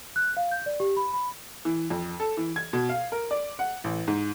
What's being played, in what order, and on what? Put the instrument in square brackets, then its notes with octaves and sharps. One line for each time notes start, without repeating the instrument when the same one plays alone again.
[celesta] F#6
F5
G6
D5
G4
B5
B5
[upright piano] E3
F2
A4
E3
G#6
B2
F5
A#4
D5
F#5
A1
G#2